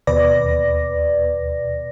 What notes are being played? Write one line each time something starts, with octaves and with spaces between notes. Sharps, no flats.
D#2 B2 B4 D5 A#6